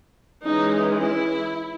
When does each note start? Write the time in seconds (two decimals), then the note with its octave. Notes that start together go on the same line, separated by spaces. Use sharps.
0.45 E3 G#3 C#4 D#4
0.99 E4